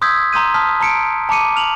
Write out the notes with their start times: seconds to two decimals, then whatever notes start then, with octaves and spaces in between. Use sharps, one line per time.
0.02 C6 D#6 E6 G6 G#6 B6
0.33 A#5 C6 D#6 G6 D#7
0.54 A5 D#6 F6 B6
0.80 A5 A#5 C#7 D7
1.29 A5 A#5 D6 C#7 D#7
1.56 F6 F7 F#7